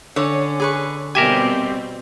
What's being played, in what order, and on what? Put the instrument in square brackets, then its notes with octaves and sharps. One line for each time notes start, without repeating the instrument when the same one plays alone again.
[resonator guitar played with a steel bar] D3 C#5 [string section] C#4
[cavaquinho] G#4 B4 C#6
[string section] B2 G3 C4 [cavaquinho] G4 [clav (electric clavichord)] A#4 E5 G#5